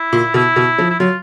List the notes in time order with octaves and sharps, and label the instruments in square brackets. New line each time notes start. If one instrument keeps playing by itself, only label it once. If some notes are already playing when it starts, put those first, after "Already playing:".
Already playing: [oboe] E4
[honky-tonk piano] A#2
[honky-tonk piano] B2 [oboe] E4
[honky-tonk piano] B2
F3
[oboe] E4
[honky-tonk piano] F#3 [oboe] F4